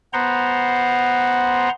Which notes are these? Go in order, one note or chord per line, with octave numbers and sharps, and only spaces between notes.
B3 C5 F#5 A#5 C6